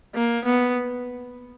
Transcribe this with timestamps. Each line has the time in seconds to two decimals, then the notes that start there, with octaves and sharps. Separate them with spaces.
0.15 A#3
0.45 B3